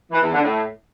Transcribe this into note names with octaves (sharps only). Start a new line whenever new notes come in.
E3
E2
D3
A2